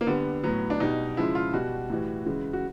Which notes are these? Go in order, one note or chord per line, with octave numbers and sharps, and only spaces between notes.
A#3
D3 G3 B3
A2 F#3 B3
D4
B2 G3 D#4
C#3 F3 G#3 E4
F4
B2 G3 F#4
A2 E3 G3
C#3 E3 G#3
F#4